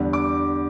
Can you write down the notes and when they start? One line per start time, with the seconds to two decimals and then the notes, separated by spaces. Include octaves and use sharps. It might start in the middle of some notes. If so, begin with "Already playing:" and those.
Already playing: E2 D3 G3
0.13 D6